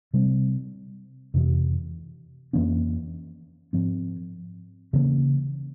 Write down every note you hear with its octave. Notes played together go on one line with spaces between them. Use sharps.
C3 G3 C4
F2 C3 E3
F2 E3 A#3 C#4
G#2 F3 C4
C#3 E3 A#3 C#4